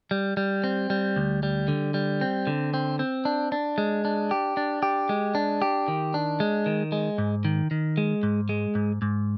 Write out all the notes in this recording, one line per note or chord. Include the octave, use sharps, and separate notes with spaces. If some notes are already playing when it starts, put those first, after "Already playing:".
G3
G3
C4
G3
D2
G3
D3
G3
C4
D3
C4
C4
D4
D4
G#3
D4
G4
D4
G4
G#3
D4
G4
D#3
D4
G#3
D#3
G#3
G#2
D#3
D#3
G#3
G#2
G#3
G#2
G#2